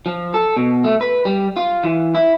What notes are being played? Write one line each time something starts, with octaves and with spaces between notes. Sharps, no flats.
F3
A4
B2
A3
B4
G3
F4
E3
E4